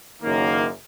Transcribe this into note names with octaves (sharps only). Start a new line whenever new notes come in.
F#1 F#2 D#3 A#3